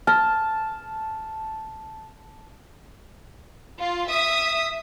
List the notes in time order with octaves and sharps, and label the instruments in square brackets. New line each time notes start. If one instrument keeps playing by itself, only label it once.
[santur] A5 [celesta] F6
[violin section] F4
E5 D#6